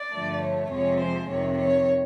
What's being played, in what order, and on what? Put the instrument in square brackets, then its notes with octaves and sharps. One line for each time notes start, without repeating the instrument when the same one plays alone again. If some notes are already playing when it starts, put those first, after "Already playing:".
Already playing: [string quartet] D5
G2 D3 F3 A3
C#5
F2 C3 F3 G#3 C#5
C5
F2 C3 D#3 C#5
C#5